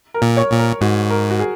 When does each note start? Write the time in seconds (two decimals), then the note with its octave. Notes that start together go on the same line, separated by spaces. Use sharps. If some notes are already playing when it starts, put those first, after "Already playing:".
0.14 A#4
0.22 A#2
0.37 C#5
0.51 A#2
0.59 A#4
0.81 G#2 F#4
1.10 A#4
1.30 F#4
1.40 G#4